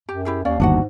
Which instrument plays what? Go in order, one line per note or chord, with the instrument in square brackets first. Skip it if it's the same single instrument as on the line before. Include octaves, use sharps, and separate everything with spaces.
[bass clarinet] F#2 [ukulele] G4
[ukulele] E4 G4 G#4
[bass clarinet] D#2 [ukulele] C#4 D5 F5
[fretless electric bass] G1 D#2 [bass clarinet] G#2 [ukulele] D4 F#4 F#5